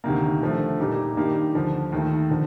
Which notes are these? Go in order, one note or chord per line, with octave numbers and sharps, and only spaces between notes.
D2 C3 D#3 A#3
D3 F3 A3
A#2 G3 A#3 D#4 G4
G2 D#3 A#3 D#4 G4
D2 D3 F3
D#2 D#3 A3
D3 F3